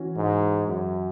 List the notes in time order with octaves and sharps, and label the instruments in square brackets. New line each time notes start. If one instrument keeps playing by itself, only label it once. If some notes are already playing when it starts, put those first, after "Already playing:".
Already playing: [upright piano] E3 C#4 F#4
[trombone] G#2
F#2